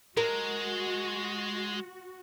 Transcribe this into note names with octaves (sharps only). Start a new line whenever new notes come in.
G#3 F#4 A#4